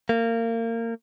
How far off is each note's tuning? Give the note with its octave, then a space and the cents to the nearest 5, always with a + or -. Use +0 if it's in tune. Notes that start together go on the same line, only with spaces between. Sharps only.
A#3 -25